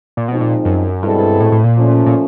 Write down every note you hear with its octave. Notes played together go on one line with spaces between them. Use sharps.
A#2
B2 F3 G#3 C4 D#4
A#2
F#2
G2 B2 G#3 C4 E4 A4
A2
A2
A#2
F3 A3 C#4
A#2